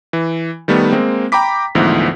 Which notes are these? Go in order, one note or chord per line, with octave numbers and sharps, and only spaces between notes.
E3
D#3 G3 A3 B3
G#3 A#3 C4
G5 A#5 B5 D6 B6
D2 G#2 E3 F3 B3